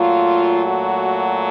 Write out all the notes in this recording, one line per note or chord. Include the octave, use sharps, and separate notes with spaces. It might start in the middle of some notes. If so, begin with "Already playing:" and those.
Already playing: A#2 F#3 A3 F4
F#4